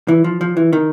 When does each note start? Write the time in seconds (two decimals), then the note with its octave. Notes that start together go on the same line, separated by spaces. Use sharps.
0.08 E3
0.24 F3
0.41 F3
0.57 E3
0.73 D#3